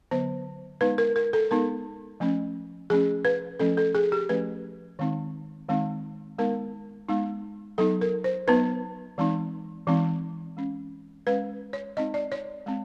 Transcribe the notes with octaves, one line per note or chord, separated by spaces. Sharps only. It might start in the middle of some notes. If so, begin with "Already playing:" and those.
D3 F#3 B3 C5
G#3 B3 D#4 B4
A#4
A#4
A4
G#3 B3 D#4 A#4
F3 A3 C#4
F3 A3 C#4 G#4
B4
F3 A3 C#4 A4
A4
G#4
G4
F3 A3 C#4 B4
D#3 G#3 C4 D#4
D#3 G#3 C4 D#4
G#3 B3 D#4 A#4
G#3 B3 D#4
F#3 B3 D#4 A4
A#4
C5
F#3 B3 D#4 B4
E3 G#3 C4 D#4
E3 G#3 C4 D#4
G#3 C#4
G#3 C#4 B4
C#5
G#3 C4 D#4 D#5
D5
C#5
G#3 C4